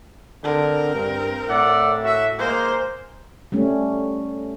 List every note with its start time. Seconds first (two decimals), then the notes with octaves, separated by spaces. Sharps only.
0.44 D3 C4 A#4
0.95 G2
1.47 A2 D5 E5 F#5
2.03 F#4 E5
2.39 G#3 A#3 C5
3.52 G3 A3 C#4